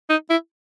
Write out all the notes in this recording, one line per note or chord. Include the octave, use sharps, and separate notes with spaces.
D#4
E4